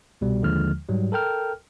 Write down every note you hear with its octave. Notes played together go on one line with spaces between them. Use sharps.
C2 B2 G3
D#2 D3 F3 G#3 F6
G#2 F#3 G3
A4 A#4 G5 F6